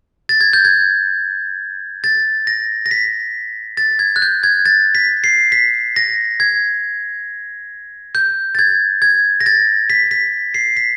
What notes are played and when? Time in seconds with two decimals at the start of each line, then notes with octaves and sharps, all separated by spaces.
0.29 A6
0.41 G#6
0.53 G6
0.65 G#6
2.04 A6
2.47 A#6
2.86 A#6
2.91 B6
3.77 A6
3.99 G#6
4.16 F#6
4.22 G6
4.43 G#6
4.66 A6
4.95 B6
5.24 C7
5.52 B6
5.96 A#6
6.40 G#6
8.15 G6
8.55 A6
8.59 G#6
9.02 G#6
9.41 A#6
9.46 A6
9.90 B6
10.11 B6
10.54 C7
10.77 B6